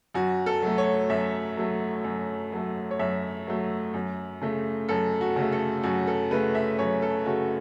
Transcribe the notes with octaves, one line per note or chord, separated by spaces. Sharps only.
F#2 F#4
A4
F#3 A3
C#5
F#2 E5
F#3 A3
F#2
F#3 A3
C#5
F#2 E5
F#3 A3
F#2
C#3 A3
F#2 A4
F#4
C#3 A3
A4
F#2 F#4
A4
C#3 A3 B4
E5
F#2 C#5
A4
C#3 A3 F#4